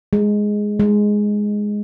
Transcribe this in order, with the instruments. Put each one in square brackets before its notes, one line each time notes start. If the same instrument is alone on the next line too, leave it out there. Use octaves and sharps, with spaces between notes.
[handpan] G#3
G#3